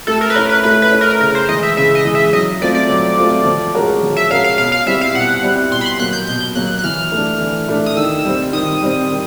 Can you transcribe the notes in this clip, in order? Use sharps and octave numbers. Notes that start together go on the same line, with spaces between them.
A3 A4
A#4
B4
C#4 E4 A#4
B4
A3 B4
B4
C#4 E4
A#4
C#3 A#4
C5
E3 G#3 D#5
E5
C#3 E5
D#5
E3 G#3
E5
F#3 D#5
A3 C4 F4 D5
D5
F#3
A3 C4 F4
F3
G#3 C#4 F#4 A#4
F3
E5
G#3 C#4 F#4 A#4 F5
F5
B2 F5
F5
G3 C4 E4 G4 E5
F5
B2 F#5
G3 C4 E4 G4
B2 C6
B5
C6
F#3 A#3 F#6
G6
B2 G6
F#3 A#3 F#6
F#6
E3 F6
A3 D4
E3
A3 D4
D#6
D#3 E6
G3 C4
D#3 D#6
G3 C4
D#3